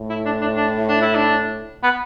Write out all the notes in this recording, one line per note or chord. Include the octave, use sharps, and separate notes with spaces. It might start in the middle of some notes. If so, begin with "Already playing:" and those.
Already playing: A2
E4
D4
D4
D4
D4
E4
D4
B3